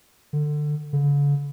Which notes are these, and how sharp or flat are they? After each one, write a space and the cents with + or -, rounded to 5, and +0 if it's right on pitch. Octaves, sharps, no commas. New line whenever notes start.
D3 +20
D3 -45